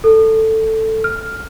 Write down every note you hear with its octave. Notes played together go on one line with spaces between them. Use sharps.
A4
F6